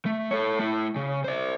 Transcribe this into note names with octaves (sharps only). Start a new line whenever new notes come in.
A3
A4 C#5
A3 E4
C#3
C5 D5